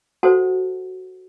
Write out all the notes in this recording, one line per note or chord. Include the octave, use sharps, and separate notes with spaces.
F#4 A4 C5 F#5 A5